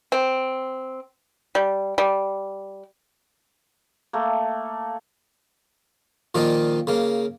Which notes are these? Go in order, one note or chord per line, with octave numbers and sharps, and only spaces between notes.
C4
G3
G3
A3 A#3
A#2 D#3 F3 D4 D#4
C#3 A#3